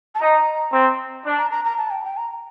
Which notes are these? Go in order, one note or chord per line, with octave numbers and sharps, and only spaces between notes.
A5
D#4 A#5
C4
D4
A#5
A#5
A#5
A5
G5
G5
A#5